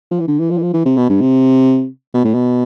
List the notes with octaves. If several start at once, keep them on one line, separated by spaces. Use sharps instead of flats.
F3
E3
D3
E3
F3
E3
F3
E3
C3
B2
G2
C3
B2
A2
B2